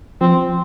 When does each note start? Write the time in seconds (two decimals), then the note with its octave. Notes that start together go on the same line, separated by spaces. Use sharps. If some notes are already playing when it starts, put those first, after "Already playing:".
0.21 F3 C4